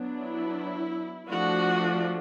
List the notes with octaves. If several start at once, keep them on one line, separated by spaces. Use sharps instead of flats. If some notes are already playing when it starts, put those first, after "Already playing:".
Already playing: F#3 B3 D4
E4
F3 A3 D4 F#4